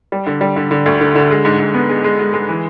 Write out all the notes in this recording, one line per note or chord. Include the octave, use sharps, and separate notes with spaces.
G3
D3
G3
D3
D3
D2
D3
D3
G#3
G#2
G#2
B3
G#3
G#3
G#3
G#3
E3